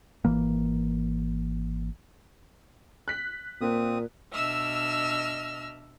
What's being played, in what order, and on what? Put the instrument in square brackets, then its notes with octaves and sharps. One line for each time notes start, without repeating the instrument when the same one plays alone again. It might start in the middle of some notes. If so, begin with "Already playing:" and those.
[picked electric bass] G#1 E3 A#3
[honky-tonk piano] F#6 B6
[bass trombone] A#2 [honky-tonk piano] A#3 [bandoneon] C4 D#6
[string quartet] B2 D4 D#5 E5 E6 F6